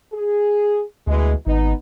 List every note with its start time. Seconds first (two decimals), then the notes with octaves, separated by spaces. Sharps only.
0.13 G#4
1.07 D2 B2 E3 G#3
1.47 G#1 B3 D#4